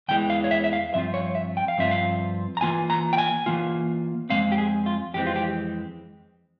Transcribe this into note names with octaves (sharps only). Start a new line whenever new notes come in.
E2 E3 G#3 G5
F5
C#5
E5
E5
F5
G2 F3 C4 F4 E5
C#5
E5
G5
F5
G2 F3 C4 F4 E5
F5
A#5
E3 A#3 F4 G#5
A#5
G5
G#5
E3 A#3 F4
F2 E3 G#3 C4 F5
G4
G#4
F4
F2 E3 G#3 C4 G4
F4
G4